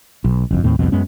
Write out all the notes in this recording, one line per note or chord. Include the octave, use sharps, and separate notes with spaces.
B1
F#1 F2
D#2 A2 C4
F1 C2 F2 B2
F#2 G#3 B3 C#4